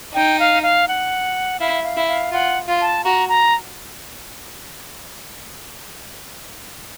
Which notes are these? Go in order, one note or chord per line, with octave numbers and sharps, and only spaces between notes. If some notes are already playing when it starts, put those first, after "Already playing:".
D#4 G5
F5
F5
F#5
E4 F5
F5
E4
F5
F4 F#5
F4
A5
F#4 A#5
A#5